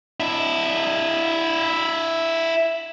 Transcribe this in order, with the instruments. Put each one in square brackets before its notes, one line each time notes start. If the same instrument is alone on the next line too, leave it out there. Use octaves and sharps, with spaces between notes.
[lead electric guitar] D4 E4